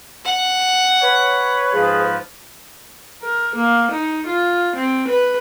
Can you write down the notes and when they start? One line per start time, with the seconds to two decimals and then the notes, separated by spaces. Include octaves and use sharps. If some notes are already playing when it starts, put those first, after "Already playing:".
0.25 F#5
1.02 B4 C#5
1.73 G#2 F3 G#4
3.22 A#4
3.55 A#3
3.91 D#4
4.26 F4
4.76 C4
5.08 B4